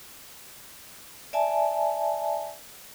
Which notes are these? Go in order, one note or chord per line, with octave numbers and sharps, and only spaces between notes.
D5 E5 G#5 A5